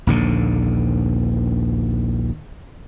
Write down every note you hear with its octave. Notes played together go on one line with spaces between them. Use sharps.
A#1 D#2 D3